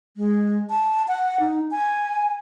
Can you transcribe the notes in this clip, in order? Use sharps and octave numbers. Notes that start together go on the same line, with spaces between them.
G#3
A5
F#5
D#4
G#5